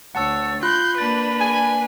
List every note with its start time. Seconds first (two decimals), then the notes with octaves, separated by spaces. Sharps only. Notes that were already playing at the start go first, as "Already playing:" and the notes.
0.15 D2 C#5 F#5 A5 E6 A6
0.63 F4 B5 C6 F#6 G6
0.98 A#3 D4 B4 A6
1.40 G#5